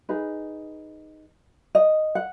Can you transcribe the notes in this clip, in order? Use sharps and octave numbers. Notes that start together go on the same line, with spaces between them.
D#4 G#4 B4
D#5
F#5